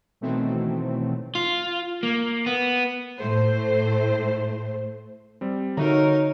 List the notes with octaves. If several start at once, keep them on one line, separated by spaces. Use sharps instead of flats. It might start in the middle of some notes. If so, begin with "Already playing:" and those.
B2 D#3 E3 F#3 A3 C4
F4
A#3
B3
A2 A3 C5
G3 C4
D3 D#4 F#4 A#4 C#5 E5 A#5